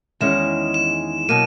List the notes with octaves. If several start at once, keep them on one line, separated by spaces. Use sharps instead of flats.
E2 D#3 G#3 C#4 E7
E7
B2 F#3 A#3 D#7